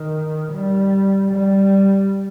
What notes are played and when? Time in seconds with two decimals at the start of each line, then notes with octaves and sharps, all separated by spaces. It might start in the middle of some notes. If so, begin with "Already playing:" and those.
Already playing: D#3
0.53 G3
1.32 G3